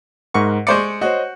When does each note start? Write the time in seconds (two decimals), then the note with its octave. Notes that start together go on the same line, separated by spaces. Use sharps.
0.34 G#2 A#4 F#5 C#6
0.67 G#3 C5 D5 C#6 G6 C#7
1.01 F#4 C5 C#5 D#5